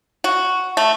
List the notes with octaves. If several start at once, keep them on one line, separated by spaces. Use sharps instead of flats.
F#4
A3